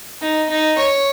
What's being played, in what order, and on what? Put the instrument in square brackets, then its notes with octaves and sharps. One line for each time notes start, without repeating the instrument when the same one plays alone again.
[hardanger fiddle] D#4
D#4
C#5